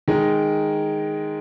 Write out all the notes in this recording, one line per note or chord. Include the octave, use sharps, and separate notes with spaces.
D#3 G#3 D#4